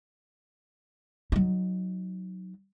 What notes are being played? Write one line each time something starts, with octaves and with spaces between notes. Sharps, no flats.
F#3 D#4